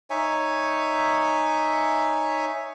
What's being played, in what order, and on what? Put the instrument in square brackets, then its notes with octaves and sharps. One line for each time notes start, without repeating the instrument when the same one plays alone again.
[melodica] D#4 C#5 E5 G#5